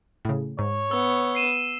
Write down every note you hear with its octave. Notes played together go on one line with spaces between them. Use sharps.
A2 C#3
G#2 C#5
B3 E6
C7 D#7 E7